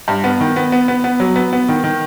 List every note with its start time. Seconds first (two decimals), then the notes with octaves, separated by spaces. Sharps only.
0.08 G2
0.24 B3
0.40 D#3
0.56 B3
0.72 B3
0.88 B3
1.04 B3
1.20 F#3
1.36 B3
1.53 B3
1.69 D#3
1.84 D#3